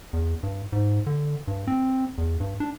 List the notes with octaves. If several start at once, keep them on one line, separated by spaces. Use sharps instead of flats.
E2
G2
G#2
D3
G2
C4
E2
G2
D4